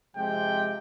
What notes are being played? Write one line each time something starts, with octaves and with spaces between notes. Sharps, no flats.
C3 F3 G#3 G5